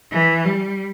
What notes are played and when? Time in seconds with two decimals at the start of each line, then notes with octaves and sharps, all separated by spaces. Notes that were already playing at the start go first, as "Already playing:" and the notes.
0.12 E3
0.45 G3